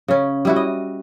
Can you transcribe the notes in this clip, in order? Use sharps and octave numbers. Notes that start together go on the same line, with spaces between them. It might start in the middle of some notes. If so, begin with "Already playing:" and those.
C#3 C#4
G3 E4 F#4
D#5